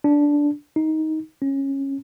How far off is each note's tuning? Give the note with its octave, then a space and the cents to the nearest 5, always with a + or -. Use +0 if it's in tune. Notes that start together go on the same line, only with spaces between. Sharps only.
D4 -10
D#4 +15
C#4 -15